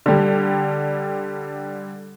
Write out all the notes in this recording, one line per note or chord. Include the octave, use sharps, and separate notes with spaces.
D3 G3